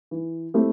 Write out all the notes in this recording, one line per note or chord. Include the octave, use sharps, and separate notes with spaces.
E3
A3 C4 E4 G4